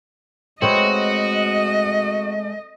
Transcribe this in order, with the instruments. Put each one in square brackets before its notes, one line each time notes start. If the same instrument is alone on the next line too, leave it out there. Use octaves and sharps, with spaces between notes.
[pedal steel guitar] G#3 A3 [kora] C4 B4 C#5 [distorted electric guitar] F#4 [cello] D#5